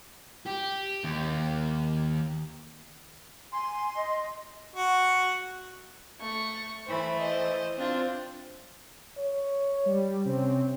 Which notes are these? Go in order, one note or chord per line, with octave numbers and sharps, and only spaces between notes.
G4
D#2
G#5 C6
D#5
F#4
A3 C#6
E3 A3 C5 B5
C5 D#5
C4 D4 F4
C#5
G3
C3 C4 C#4